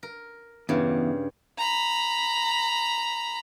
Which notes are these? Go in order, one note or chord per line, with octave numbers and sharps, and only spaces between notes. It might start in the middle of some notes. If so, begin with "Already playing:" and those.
A#4
E2 G2 C#3
A#5 B5